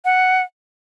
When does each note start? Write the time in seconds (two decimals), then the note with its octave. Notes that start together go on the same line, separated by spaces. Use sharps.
0.05 F#5